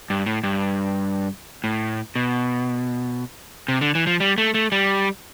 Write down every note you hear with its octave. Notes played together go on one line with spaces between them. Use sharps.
G2
A2
G2
A2
B2
C3
D3
E3
F3
G3
A3
A3
G3